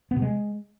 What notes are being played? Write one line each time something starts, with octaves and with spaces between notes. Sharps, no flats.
B3
C3
G#3